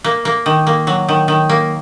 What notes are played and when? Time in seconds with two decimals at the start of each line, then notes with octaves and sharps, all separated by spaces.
0.04 A#3
0.25 A#3
0.46 D#3
0.67 A#3
0.87 F#3
1.09 D#3
1.28 D#3
1.49 A#3